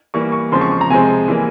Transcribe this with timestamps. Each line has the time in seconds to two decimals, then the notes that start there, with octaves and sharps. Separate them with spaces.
0.14 E3 G3 A#3 C#6
0.32 C#6
0.52 C#3 F3 G#3 C4 C6
0.61 C#6
0.72 C#6
0.81 A#5
0.90 C3 F3 G#3 C4 G#5
1.28 E3 G3 A#3